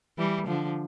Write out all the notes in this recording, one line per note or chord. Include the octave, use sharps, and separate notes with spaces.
E3 G3
D3 F3